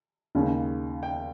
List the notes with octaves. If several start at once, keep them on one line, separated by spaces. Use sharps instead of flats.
D#2 C#3 G#3
G5